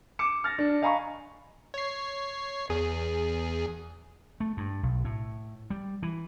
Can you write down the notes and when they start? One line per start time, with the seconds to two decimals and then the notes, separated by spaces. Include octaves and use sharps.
0.19 D6 C#7 E7
0.44 F6 A6 A#6
0.58 D4
0.82 D#5 F5 G#5 A#5 B5 C#6
1.74 C#5 C7
2.69 E2 G#4
4.40 A3
4.57 G2
4.83 B1
5.04 A2
5.70 G3
6.03 E3